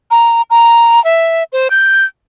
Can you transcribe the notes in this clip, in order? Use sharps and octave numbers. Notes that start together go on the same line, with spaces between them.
A#5
A#5
E5
C5
G6